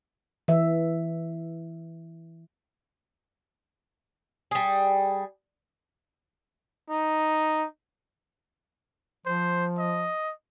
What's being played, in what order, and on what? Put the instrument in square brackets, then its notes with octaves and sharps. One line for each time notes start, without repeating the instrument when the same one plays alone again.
[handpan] E3 E5
[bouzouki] G3 G#4
[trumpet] D#4
[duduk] F3 [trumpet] C5
[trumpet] D#5